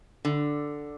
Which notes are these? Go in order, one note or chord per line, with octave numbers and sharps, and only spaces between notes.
D3